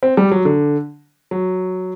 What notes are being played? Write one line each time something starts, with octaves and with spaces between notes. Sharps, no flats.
C4
G3
F#3
D3
F#3